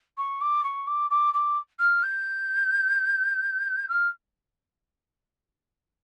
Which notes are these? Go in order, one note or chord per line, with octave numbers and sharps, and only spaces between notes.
C#6
D6
C#6
D6
D6
D6
F6
G6
F6